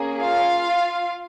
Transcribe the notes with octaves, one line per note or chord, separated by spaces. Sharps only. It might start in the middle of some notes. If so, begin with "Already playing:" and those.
Already playing: A#3 C#4 G#4
F4 F5